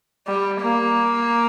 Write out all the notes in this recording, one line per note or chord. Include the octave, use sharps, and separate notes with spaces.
G3
A#3